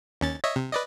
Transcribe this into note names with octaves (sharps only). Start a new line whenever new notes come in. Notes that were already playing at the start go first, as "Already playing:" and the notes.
D#2 C#4 A6
C#5 D#5 E5
C3
B4 D5 D#5